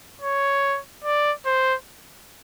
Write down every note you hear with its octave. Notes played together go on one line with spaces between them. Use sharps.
C#5
D5
C5